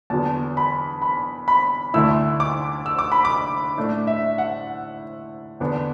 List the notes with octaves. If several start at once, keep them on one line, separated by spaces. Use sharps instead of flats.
E2 D3 F#3 B3 A5
B5
B5
B5
D2 D3 A3 E4 E6
D6
E6
D6
B5
D6
A2 A3 D4
E5
F#5
E2 D3 B3 D4